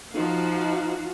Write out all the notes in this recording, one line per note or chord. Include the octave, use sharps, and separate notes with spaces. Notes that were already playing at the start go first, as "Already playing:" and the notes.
F3 D#4 F#4 F5